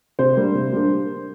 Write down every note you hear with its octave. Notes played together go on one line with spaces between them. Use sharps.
C3 C5
G3 A#3 D4
C3
G3 A#3 D4